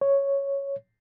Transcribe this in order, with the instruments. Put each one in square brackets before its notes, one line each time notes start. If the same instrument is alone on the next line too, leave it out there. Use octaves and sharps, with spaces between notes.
[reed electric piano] C#5